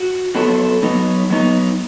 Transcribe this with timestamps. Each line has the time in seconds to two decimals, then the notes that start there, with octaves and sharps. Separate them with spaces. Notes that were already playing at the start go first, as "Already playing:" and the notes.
Already playing: F#4
0.35 F#3 B3 F#4 A4
0.83 F#3 B3 D#4
1.30 F#3 B3 D#4